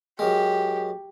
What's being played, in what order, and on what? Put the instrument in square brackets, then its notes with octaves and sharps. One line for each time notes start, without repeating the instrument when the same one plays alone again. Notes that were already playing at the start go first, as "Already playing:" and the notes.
[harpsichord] F#2 G#3 [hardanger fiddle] G4